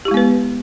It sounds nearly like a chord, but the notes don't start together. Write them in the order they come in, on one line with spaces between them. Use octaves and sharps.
G4 E4 G#3 B3 B4